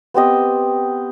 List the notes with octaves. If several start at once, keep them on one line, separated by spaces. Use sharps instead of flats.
B3 C4 G4 D#5